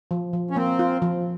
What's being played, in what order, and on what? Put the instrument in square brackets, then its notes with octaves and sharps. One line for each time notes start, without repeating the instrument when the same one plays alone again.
[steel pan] F3
F3
[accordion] C#4
[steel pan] A#3 [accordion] C4
[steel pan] F4
F3